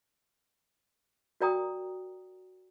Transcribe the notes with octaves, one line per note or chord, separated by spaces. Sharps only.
F#4 A#4 D5 G5 A#5 D#6